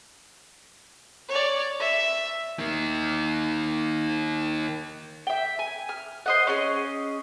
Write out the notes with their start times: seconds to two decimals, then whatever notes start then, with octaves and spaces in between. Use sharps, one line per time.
1.29 C#5 D5
1.79 E5
2.59 D#3 A#3
5.27 E5 G5
5.59 G#5
5.89 F6
6.26 C5 D#5 F#5
6.47 C#4 G#4 A4 D#5